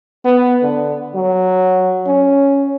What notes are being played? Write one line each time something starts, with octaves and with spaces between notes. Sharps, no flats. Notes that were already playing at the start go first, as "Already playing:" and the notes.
B3
D3
F#3
C#4